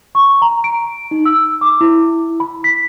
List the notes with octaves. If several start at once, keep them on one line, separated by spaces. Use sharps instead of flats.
C#6
A#5
D7
D#4
E6
D6
E4
B5
B6